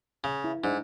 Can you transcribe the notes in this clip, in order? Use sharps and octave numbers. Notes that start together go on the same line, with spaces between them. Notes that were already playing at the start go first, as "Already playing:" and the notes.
C#3
E4
G#2 D4 G#4